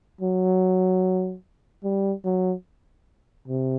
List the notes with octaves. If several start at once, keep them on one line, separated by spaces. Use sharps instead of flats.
F#3
G3
F#3
C3